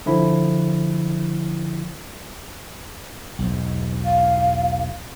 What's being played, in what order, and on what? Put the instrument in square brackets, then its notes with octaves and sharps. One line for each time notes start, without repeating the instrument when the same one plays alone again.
[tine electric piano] D3 F3 E4
[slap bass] B1 E2 G#2
[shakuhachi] F5